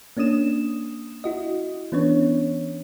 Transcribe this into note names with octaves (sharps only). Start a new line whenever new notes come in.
A#3 C#4 D4 D#6 E7
E4 F#4 D#5
E3 B3 C#4 D4 C#5